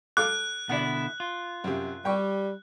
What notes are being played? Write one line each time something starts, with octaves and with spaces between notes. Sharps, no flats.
A4 F5 D6 F#6
B2 D3 E4 D5 F#5
F4
F#2 C3
G3 G5 C#6